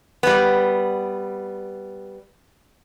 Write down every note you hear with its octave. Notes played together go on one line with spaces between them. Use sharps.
G3 B3